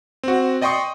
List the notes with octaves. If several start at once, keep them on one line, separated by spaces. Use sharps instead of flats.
C4 F#4
D5 D#5 G5 C6 C#6 D#6